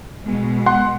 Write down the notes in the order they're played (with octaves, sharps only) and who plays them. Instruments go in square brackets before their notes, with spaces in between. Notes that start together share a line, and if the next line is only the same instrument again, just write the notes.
[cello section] B2 G#3
[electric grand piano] F#5 C6